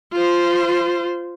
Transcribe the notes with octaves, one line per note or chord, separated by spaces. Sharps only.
F4 C5